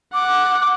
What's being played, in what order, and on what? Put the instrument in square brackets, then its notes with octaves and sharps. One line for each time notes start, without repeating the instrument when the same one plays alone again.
[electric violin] F#5 [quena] D6
[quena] D6